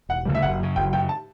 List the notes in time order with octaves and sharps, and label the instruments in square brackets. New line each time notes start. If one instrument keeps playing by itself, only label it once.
[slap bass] E1 [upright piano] F#5
[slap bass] D2 C#3 G3
[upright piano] E5
[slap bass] F#1 [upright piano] F#5
[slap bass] F#2 C#3
[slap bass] F#1 [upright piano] G5
[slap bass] F#2 C#3 [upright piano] G5
[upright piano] A5